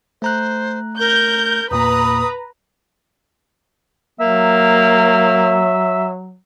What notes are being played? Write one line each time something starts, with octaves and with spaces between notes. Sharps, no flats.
A3 C5 A#5 F#6
A#4 G6
E2 A#2 A#3 B4 A#5 D#6
F#3 A#3 E5